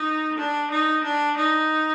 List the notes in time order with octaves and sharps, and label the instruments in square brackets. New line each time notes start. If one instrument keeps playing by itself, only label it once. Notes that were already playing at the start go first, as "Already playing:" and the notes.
Already playing: [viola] D#4
D4
D#4
D4
D#4